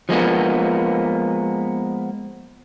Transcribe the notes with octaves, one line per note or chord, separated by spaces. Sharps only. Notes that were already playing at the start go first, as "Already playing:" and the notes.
F3 G#3 A#3 B3